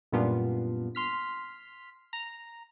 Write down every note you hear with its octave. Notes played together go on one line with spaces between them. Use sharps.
F#2 A#2 G3 B3 D4 F4
C6 F6 B6
A#5